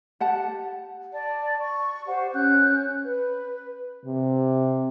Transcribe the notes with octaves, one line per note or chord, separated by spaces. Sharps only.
G4 F#5 A5
D5 A5
C#6
G4 C5 F#5
C#4 F#6 G6
B4
C3